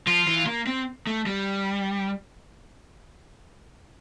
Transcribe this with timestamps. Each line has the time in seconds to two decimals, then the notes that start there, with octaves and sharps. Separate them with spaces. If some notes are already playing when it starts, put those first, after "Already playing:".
0.07 F3 F4
0.28 E3
0.47 A#3
0.67 C4
1.07 A3
1.26 G3